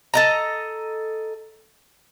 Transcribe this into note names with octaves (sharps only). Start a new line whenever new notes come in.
A4 D#5 A#5